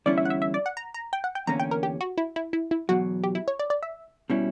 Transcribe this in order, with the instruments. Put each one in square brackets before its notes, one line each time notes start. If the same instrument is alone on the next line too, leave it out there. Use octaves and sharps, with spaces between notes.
[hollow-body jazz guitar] E2 D3 G3 C#4 E4 [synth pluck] D5
[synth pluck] E5
F#5
E5
E5
D5
F#5
A#5
A#5
G5
F#5
G5
[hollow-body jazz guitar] E2 D3 A#3 C#4 [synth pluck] A#5
[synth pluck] G5
A#4
G4
F#4
E4
E4
E4
E4
[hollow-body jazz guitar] E2 B2 F#3 [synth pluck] F#4
[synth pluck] G4
E4
C#5
D5
D5
E5
[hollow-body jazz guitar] B2 G3 C#4 E4